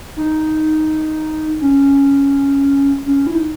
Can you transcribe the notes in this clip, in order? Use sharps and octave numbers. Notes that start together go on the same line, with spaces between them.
D#4
C#4
C#4
E4
D#4